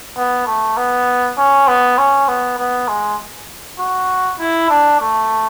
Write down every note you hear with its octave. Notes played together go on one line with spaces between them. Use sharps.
B3
A3
B3
C#4
B3
C#4
B3
B3
G#3
F#4
E4
D4
A3